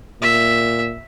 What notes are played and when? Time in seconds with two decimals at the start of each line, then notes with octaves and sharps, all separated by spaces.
0.22 A#2 E5